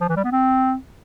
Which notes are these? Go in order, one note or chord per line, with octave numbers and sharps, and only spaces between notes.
F3
E3
G3
B3
C4